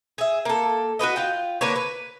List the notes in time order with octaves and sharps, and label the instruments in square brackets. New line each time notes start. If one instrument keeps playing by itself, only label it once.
[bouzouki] G#4 E5
A#3 A4
F#4 G4 B4 D#5
F4 G5
D3 A#3 B4 C#5
B4